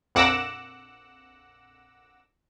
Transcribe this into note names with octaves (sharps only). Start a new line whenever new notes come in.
A#1 F2 F#5 D6 E6 A#6